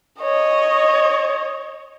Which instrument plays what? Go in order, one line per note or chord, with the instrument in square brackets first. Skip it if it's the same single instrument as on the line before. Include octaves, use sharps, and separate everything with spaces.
[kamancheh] C#5 D#5